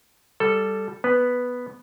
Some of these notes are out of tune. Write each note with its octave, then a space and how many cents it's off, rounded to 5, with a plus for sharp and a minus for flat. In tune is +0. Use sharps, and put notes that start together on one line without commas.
G3 +0 A4 +0
B3 +0 B4 +0